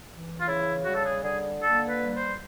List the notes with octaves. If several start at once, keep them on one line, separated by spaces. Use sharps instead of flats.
E3
F4
C#3 E4
G3 F#4
A4
G#4
D3 G#4
A#3 A4
B4
G3
C5